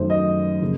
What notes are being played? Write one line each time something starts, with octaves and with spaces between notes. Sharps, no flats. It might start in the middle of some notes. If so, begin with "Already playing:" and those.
Already playing: F#2 D#3 A3 C5
D#5
C#3 F3 A#3